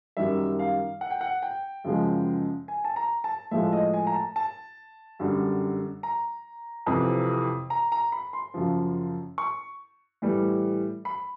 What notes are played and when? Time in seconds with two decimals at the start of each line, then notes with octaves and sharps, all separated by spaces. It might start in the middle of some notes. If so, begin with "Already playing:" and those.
0.17 F#2 D#3 G3 E5
0.59 F5
1.01 F#5
1.11 G5
1.21 F#5
1.42 G5
1.84 F#2 C#3 F3 G#3
2.68 G#5
2.85 A5
2.96 A#5
3.24 A5
3.51 A2 F3 G#3 E5
3.73 D#5
3.94 G#5
4.07 A#5
4.15 A5
4.36 A5
5.20 F#2 D3 G3
6.03 A#5
6.86 F2 C3 E3
7.70 A#5
7.92 A#5
8.12 B5
8.33 C6
8.54 F#2 C#3 F3
9.38 C#6
10.22 A2 E3 G3
11.05 B5